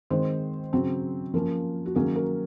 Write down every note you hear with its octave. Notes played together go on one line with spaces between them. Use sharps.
D#3 G#3 C4 C5
C#3 F#3 C4
F3 A#3 C#4 A#4
F#4
D#3 F#3 A#3 C#4 G#4
A#4